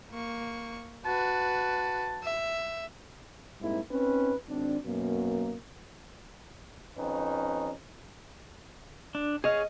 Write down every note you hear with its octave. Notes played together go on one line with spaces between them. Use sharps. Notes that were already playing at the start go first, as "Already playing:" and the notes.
A#3 C#6
F#4 B4 A5
E5
G#2 G3 A#3 C4 E4
C4 C#4 D#4 B4
G#1 C4 D4
F#2 B2 A#3
F2 C#4 D#4 B4
D4
G#4 C#5 D#5 F5